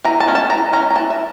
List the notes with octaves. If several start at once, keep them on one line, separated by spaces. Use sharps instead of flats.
E3 A#5
A5
G#3 C#4
A5
E3 A#5
G#3 C#4 A#5
A#5
E3 A5
E5